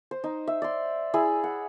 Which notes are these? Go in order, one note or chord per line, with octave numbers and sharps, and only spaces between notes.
C5
D#4
E5
D5 C6
E4 G#4 G#5 B5
F#5